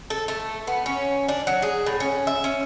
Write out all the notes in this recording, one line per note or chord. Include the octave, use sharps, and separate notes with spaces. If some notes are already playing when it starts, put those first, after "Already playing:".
A4
A3
B3
C#4
D4
F#3
G#4
A2
C#4
E5
C#4